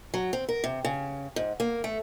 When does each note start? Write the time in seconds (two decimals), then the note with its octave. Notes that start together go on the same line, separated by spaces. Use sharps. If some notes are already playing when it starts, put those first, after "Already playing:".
0.14 F#3
0.33 C4
0.49 A#4
0.64 C3
0.85 C#3
1.36 G#2
1.60 A#3
1.84 A3